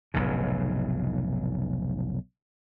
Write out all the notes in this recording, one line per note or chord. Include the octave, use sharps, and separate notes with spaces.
F1 B1 G#2 C#3